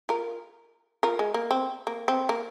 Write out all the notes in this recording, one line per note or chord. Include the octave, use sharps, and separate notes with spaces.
F4 A#4
F4 A#4
G#3
A#3
C4
A#3
C4
A#3